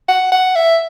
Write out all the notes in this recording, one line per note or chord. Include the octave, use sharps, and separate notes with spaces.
F#5
F#5
E5